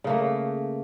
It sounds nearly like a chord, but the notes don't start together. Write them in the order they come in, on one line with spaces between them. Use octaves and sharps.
C#3 A#3 A3